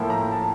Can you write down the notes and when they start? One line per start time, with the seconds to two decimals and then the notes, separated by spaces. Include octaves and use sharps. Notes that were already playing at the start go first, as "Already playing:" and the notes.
Already playing: A2 F3 A#3 E4 G5
0.10 A#5
0.32 A5